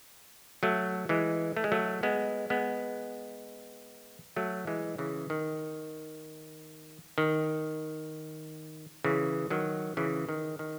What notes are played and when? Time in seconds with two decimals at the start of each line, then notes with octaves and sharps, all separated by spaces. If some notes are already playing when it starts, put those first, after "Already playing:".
0.63 F#3 A3
1.09 E3 G#3
1.56 A3
1.64 G#3
1.72 F#3 A3
2.03 G#3 B3
2.50 G#3 B3
4.36 F#3 A3
4.67 E3 G#3
4.98 C#3 E3
5.30 D#3
7.18 D#3
9.04 C#3 E3
9.50 D#3 F#3
9.97 C#3 E3
10.29 D#3
10.59 D#3